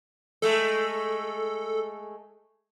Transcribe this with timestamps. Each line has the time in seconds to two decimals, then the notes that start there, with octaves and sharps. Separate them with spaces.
0.42 G#3 A3 A4